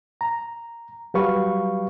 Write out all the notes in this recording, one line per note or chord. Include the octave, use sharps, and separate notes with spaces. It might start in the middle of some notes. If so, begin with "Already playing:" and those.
A#5
F#3 G3 G4 B4 F5 C#6